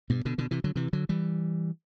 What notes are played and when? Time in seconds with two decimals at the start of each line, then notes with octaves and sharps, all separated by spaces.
0.10 G2 B2
0.25 B2 D3
0.38 B2 D3
0.51 C3 E3
0.64 D3 F#3
0.76 C3 E3
0.93 D3 F#3
1.09 E3 G3